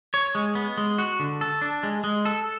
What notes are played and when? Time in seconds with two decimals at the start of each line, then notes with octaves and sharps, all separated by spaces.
0.14 C#5
0.35 G#3
0.55 B3
0.77 G#3
0.98 F#4
1.20 D3
1.41 A4
1.62 D4
1.83 G#3
2.04 G#3
2.25 A4